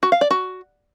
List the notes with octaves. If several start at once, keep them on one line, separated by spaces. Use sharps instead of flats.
F#4
F5
D5
F#4